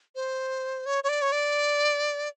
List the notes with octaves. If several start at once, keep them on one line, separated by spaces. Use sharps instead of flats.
C5
C#5
C#5
D5
C#5
D5